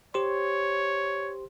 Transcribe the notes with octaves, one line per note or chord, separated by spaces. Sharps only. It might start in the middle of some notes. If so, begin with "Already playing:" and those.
G4 C5 C#5 C6